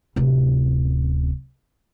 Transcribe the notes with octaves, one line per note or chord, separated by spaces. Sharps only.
D1 C3